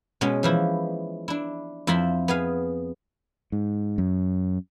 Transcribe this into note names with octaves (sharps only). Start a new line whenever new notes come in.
B2 G#3 B3 C#4
E3 F3 E4
D4 E4
F2 E4 C5 A5 B5 C6
B3 G#4 F5
G#2
F#2